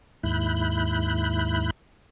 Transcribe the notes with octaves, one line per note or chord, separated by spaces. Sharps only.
D#2 G#2 E4 B5 F#6 G6